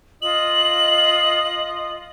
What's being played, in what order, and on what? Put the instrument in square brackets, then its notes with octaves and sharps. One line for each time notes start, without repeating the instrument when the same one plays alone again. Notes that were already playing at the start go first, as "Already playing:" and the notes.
[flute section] F4 D#5 D#6 [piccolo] F#7